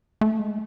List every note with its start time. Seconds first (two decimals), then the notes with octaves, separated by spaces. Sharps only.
0.21 A3
0.40 G#3